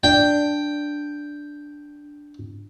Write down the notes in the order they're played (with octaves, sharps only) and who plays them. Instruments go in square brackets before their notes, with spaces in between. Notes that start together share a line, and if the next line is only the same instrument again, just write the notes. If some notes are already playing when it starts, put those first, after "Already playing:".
[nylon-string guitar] D4 [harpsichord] G5